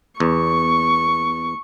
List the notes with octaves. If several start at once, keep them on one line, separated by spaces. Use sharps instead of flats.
E2 C#6